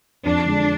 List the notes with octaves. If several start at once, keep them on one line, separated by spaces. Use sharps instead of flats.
F2 D4
D3 G#3